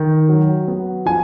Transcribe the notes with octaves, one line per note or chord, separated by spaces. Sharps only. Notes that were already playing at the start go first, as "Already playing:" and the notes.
Already playing: D#3
F#3
B3
F3 G#5